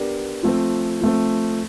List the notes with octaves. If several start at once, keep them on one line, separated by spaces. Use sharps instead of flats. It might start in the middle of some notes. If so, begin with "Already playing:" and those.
Already playing: B3 D4 G4 A#4 D5
F3 A3 C4
F3 A3 C4